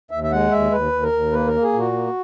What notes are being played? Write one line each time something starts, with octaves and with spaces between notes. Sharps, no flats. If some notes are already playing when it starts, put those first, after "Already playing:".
D#2 E5
E5
G#3 F#5
D#2 E5
D#2 B4
D#2
A#4
D#2
A#3 B4
A#4
A#3
G#4
A#2
F#4
A#3